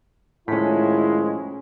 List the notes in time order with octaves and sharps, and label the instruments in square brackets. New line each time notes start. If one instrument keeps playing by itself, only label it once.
[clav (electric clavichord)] A2 [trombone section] D#3 F3 G#3 [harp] C#4 B6 [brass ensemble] E4